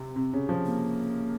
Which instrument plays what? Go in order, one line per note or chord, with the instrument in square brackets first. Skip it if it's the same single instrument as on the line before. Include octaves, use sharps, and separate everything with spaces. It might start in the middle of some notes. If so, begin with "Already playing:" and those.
Already playing: [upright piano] C3 [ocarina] C4
[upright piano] C3
C#3
F3
[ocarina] A#3